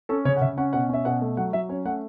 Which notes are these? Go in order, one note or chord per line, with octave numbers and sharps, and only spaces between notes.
C#4 A4
C#3 C#5
F#5
C#3 E5
C#4 F#5
B2 F#5
C#4 E5
B2 F#5
A3
F#3 F#5
F#3 E5
C#4 C#5
A3 F#5